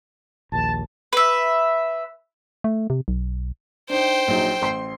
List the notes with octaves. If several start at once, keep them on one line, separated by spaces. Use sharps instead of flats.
A#1 D#2 A5
B4 E5
A3
C3
B1
D4 D#4 C5 G5
A#1 F#3 D#4
A1 C6 C7